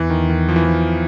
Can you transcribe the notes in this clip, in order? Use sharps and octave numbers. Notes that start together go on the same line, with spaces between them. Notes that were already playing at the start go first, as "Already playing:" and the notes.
Already playing: E2 E3
D#3
D#3
F3
E3
F3